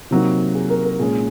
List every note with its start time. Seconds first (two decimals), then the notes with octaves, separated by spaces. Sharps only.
0.11 C3 F#3 A#3 D#4
0.55 G#4
0.70 A#4
0.85 A#4
0.99 A#2 G#3 C#4 G#4